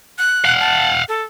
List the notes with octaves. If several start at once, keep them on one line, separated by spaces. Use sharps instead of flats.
F#6
F5 F#5
A5
A4